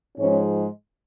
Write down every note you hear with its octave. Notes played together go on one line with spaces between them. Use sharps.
G#2 F3 G#3 C#4